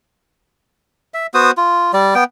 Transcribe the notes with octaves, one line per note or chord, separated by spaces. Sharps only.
E5
B3 F#4 C5 D#6
F4
G3 D5
B3 G5